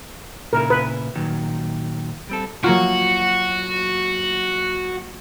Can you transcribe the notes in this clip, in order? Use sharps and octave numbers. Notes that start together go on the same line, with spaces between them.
A#2 C#3 E4 A#4
B4
A#2 D#3 F#3
G3 C4 A4
F#3 A#3 F4 F#4